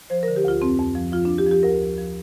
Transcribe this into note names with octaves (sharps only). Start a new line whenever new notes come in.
F3 C5
D3 A#4
G4
D2 F4
F2 C4
F2
F3
F3 F4
F3 D4
G4
F3
G4
D2 A#4
F3
F3